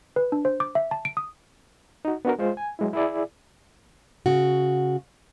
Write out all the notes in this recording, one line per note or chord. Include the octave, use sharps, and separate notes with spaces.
B4
D4
C5
D6
E5
A5
D7
D#6
D#4 F#4
B3 D4 F#4 A#4
G#3 F4 C5
G#5
F#3 G#3 E4
E4 G#4 D5
C#3 F#4